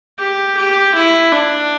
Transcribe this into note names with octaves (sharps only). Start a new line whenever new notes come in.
G4
G4
E4
D4